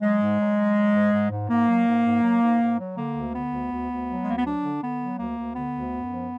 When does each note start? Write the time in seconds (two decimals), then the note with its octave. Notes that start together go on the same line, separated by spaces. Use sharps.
0.02 F#3 G#3
0.21 G#2
0.40 F#3
0.57 F#3
0.77 F#3
0.95 G#2
1.13 G#2
1.31 G#2
1.50 G#2 A#3
1.68 F#3
1.87 G#2
2.05 G#2
2.23 F#3
2.42 G#2
2.60 G#2
2.80 F#3
2.97 D3 A#3
3.16 D2
3.34 D3 B3
3.53 D2
3.71 D2
3.90 D2
4.09 F#3
4.23 G#3
4.27 D2 A#3
4.37 B3
4.45 F#3 D4
4.63 D3
4.82 D3 B3
5.00 F#3
5.19 D2 A#3
5.38 D2
5.55 D3 B3
5.75 D2
5.93 F#2
6.12 F3